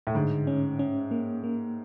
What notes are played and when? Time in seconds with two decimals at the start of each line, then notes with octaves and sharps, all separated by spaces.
0.07 A2
0.15 G#2 D3
0.47 C#4
0.79 C#4
1.11 A#3
1.44 A#3